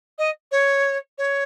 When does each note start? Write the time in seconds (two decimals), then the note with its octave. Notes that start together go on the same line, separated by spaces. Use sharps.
0.18 D#5
0.51 C#5
1.18 C#5